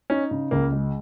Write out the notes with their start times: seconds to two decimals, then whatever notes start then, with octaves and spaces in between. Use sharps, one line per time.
0.10 C#4 D#4
0.31 C#3
0.51 C#2 A#3
0.72 G#3